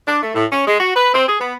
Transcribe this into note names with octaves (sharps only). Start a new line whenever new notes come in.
D4
A3
A2
C#4
G#3
F#4
B4
C4
G#4
B3